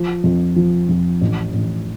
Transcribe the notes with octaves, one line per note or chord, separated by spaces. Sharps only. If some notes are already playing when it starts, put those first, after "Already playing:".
Already playing: F3
F2
F3
F2
A1
A1